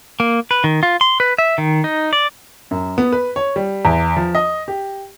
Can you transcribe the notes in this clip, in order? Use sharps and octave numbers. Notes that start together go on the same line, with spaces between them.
A#3
B4
D#3
F4
C6
B4
E5
D#3
D#4
D5
F#2
B3
B4
C#5
G3
E2
F3
D#5
G4